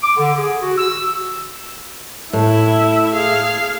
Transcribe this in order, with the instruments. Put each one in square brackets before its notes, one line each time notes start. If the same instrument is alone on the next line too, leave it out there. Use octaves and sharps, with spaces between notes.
[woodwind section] D6
D3
G#4
F#4
E6
[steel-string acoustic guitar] A2 [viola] E4 E5
[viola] G#4 F5